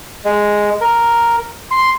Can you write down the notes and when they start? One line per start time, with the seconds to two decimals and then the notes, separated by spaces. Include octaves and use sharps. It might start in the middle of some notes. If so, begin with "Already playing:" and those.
0.25 G#3
0.81 A#4
1.71 C6